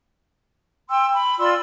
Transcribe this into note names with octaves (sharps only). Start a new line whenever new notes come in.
G5 C6 E6
B5
F4 D5 C6 E6